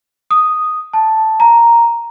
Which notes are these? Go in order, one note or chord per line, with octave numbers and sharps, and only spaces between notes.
D#6
A5
A#5